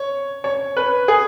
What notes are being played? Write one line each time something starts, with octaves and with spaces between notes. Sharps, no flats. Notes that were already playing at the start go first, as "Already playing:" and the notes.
Already playing: C#5
C#5
B4
G#4